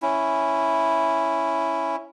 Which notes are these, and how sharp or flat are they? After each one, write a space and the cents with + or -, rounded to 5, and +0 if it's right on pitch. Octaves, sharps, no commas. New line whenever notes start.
C#4 +0 E4 +0